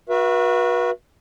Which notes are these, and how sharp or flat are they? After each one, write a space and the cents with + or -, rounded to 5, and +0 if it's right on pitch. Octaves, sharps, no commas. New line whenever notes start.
F#4 -20 B4 -35 E5 +25